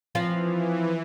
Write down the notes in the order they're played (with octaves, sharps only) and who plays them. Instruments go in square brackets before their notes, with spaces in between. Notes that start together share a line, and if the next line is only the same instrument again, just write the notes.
[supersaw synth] E3 [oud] F3 C4 F4